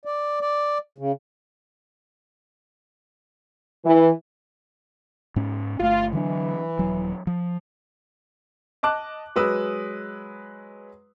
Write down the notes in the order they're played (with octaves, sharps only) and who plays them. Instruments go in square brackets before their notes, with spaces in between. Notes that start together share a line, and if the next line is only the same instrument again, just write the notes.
[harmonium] D5
D5
C#3
[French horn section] E3
[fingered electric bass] G#2 C#4
[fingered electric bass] G1 A3 [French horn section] F4
[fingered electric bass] D3 F#3 D4 [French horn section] E3
[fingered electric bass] D#1 F#3
F3
[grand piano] D#5 A5 D6 F#6
F#3 G#3 B4 D#6 E6